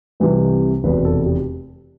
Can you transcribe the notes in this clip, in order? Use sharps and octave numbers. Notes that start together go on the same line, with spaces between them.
C2 C3 E3 G3 B4
F1 E2 B2 B4
A4
G4